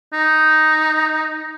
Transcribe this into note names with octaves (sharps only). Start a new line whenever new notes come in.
D#4